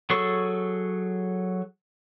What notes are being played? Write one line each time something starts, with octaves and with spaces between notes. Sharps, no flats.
F#3 G#4 A4 C#6